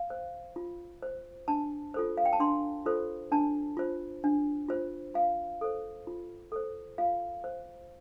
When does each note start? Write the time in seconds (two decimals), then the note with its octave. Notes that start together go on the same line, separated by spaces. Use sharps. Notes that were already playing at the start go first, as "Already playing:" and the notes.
Already playing: F5
0.10 C5
0.56 F4
1.03 C5
1.48 D4 A5
1.94 F4 A4 C5
2.17 F5
2.25 G5
2.33 A5
2.40 D4 C6
2.86 F4 A4 C5
3.32 D4 A5
3.77 F4 C5
4.24 D4
4.68 F4 C5
5.14 F4 F5
5.61 A4 C5
6.07 F4
6.52 A4 C5
6.98 F4 F5
7.44 C5